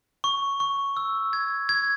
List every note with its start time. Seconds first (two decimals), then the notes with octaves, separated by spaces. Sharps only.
0.24 C#6
0.60 C#6
0.97 E6
1.33 G#6
1.69 G#6